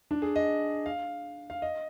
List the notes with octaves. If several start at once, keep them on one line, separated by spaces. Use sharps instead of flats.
D4
G#4
D#5
F5
F5
D#5